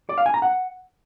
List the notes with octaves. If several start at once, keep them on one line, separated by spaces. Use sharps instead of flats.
D5
F5
G#5
A#5
F#5